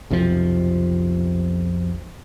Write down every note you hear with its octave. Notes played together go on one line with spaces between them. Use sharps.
B1 F2 C3 F3